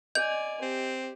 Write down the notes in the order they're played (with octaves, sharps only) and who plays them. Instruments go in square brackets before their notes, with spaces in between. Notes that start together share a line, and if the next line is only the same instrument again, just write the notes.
[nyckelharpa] D5 G#5 [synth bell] D#5 [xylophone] G6
[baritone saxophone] C4 [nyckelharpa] G4